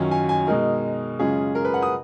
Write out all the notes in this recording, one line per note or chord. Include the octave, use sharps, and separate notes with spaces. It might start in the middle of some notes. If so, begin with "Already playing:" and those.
Already playing: F#2 D#3 F#3 C#4 F4
G#5
G#5
B2 G#3 D#4 A#4
F#2 C#3 G#3 C#4 F4 G#4
A#4
B4
F#5
D#6